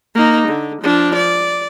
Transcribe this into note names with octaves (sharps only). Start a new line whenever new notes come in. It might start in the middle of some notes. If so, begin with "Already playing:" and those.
A#3 D#4
D3
F3 D4
D5